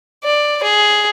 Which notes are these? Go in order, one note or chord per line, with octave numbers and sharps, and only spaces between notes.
D5
G#4